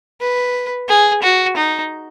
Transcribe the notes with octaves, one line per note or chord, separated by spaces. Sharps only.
B4
G#4
F#4
D#4